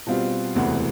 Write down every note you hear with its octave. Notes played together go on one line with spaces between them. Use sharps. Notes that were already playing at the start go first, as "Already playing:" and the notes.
B2 G3 C4 F4
E1 D2 C3 E3 B3